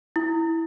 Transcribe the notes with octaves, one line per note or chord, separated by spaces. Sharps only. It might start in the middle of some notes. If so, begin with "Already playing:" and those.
E4